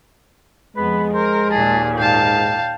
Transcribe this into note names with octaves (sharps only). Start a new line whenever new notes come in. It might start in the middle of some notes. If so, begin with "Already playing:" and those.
F2 G#3 B3 B4
A#4 C5
D#2 A#2 G#4 A5
G#2 F5 G5 A5
G5